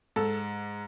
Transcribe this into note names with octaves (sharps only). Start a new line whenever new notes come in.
G#2 A4